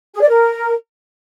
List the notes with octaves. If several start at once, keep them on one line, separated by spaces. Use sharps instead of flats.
G#4
D5
A#4